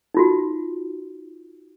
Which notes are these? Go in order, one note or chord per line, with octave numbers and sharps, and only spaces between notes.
D#4 F4 F#4